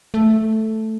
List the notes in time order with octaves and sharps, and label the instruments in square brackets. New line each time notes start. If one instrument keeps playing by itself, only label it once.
[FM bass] A3